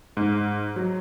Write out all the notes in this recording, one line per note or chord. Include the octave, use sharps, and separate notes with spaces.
G#2
F#3